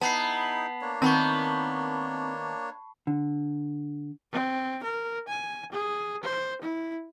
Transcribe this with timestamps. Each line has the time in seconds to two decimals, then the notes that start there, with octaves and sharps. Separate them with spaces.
0.01 B3 D#4 E4 G#4 A5 B5 C7
0.81 A#3 D4 C#5
1.02 D#3 B3 C4 A5 B5 C#6
3.07 D3
4.32 C4
4.84 A#4
5.28 G#5
5.72 G#4
6.24 C5
6.62 E4